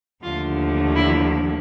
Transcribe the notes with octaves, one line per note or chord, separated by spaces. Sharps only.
D#2 D3 F3 A3 F4
E4